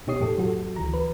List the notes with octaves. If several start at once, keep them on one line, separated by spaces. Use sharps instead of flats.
B2 D#4 G4 C#5 D#6 C7
F2 A2 G4 A4
F#3 F#4 A4
D2 E3 A#5
B4